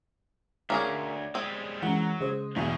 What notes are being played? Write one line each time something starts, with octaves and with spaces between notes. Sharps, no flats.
D2 A#3 C#4 G#4 C#5 D5 G#6
G3 G#3 C4
F#2 E3 F#3 G#3 F#5
C#3 G#3 C5 D#6
E2 G2 B2 E3 G#3